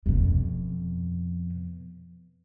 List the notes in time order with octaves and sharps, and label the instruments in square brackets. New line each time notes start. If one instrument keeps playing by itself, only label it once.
[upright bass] F2 B2